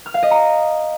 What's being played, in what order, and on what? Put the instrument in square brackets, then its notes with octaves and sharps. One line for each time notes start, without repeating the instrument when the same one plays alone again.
[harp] F6
F5
D#5
A#5